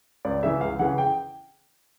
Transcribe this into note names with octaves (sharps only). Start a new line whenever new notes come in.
C#2 D5
C#3 E3 E5
C#2 F5
C#3 E3 F#5
G5